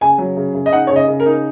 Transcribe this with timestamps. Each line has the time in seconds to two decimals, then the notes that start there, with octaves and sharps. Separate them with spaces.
0.01 C#3 G#5
0.18 F#3
0.37 C#3
0.54 C#3
0.66 D#5
0.72 D#4 F#5
0.87 C#5
0.90 C#3
0.96 D#5
1.08 C#3
1.20 A#4
1.26 D#4